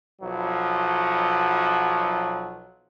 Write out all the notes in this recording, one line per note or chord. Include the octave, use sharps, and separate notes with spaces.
B1 F3 F#3